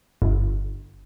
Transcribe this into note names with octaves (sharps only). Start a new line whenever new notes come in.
G1